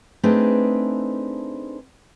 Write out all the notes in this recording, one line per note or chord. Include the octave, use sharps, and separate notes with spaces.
A3 C4 D4 D#4 G#4 B4